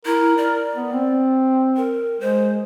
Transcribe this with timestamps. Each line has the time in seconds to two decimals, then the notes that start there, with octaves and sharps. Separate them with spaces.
0.06 E4 A#4
0.38 D5
0.76 B3
0.93 C4
1.77 A#4
2.21 G#3 C5